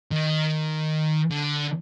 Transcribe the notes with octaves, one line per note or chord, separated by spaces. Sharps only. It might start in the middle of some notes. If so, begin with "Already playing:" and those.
D#3
D3